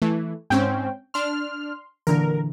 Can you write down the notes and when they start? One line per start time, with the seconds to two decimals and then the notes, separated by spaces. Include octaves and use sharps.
0.02 E3 A3
0.50 G#2 C4 C#4 G5
1.14 D4 C6 F6
2.07 A#2 D3 E3 A#4